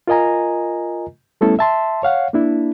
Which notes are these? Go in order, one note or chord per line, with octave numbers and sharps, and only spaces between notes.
F4 A#4 D#5 G#5 A#5
G3 A3 B3 C#4 E4 A4
E5 A5 C6
C#5 F5 F#5
A#3 D4 E4